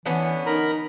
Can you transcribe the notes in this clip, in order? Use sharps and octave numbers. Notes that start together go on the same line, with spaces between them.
D3 E3 B3 C#4
D#4 A#4 A#5 B5